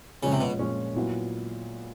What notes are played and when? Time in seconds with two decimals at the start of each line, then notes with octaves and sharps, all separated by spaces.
0.23 A#2 C#3 F3 G#3 C#4
0.32 C3
0.40 B2
0.59 A#2 F3 G#3 C#4
0.96 A#2 F#3 B3 E4